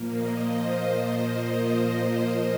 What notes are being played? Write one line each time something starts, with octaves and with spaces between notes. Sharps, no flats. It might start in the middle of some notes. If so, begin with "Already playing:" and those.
Already playing: A#2 F3 A#3
D#5
C5